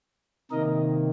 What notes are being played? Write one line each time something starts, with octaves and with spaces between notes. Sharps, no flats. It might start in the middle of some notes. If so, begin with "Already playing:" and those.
C3 D#3 A#3 A#4 D#5